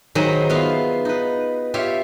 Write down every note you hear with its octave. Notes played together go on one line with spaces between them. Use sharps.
D#3 F#3 G#4 C5 D#5 B5
B3 F4 E5 F5 C6
D#4 B4
F4 G4 C#5 E5